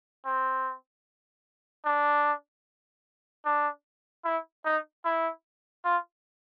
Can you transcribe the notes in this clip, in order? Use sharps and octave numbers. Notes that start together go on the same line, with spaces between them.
C4
D4
D4
E4
D#4
E4
F4